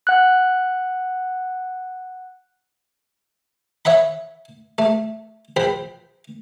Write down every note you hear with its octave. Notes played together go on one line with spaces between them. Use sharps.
F#5 F#6
C#5 E5 F#5 B5
A3
A#1 C5 G5 B5